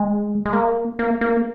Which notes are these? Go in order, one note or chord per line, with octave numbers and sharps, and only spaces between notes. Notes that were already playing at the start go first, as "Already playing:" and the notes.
Already playing: G#3
G#3
A#3
A#3
A#3